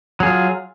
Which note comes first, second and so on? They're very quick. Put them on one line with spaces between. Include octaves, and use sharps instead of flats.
F#3 G#4 F4